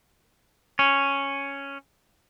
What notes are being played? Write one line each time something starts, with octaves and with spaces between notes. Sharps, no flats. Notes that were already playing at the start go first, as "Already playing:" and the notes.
C#4